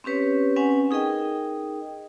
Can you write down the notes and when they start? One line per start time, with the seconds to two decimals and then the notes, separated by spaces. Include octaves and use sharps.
0.04 C4 C#4 G4 B4 C#5
0.56 C4 C#4 B4 F#5 G#5
0.91 D#4 G#4 A#4 D#5 G5